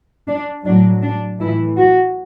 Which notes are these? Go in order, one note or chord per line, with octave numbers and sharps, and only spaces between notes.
D4
A2 F#3 D4
D4
A2 E3 E4
F#4